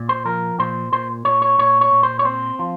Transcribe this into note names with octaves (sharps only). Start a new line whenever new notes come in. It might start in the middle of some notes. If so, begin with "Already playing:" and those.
Already playing: A#2
C5
F3 A#4
A#2 C5
A#2 C5
A#2 C#5
C#5
A#2 C#5
C#5
A#2
C5
C#5
C4 C5
F3